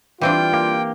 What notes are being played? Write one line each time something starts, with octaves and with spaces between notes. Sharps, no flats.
E3 G3 C4 D4 F4 G5
A#3 G4